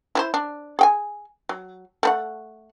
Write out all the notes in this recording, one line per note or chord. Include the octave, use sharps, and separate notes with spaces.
E4 B4 C5
D4
G#4 G5 G#5
F#3
A3 B4 F#5